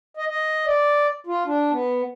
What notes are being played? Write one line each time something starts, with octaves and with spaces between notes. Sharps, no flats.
D#5
D#5
D5
F4
D4
B3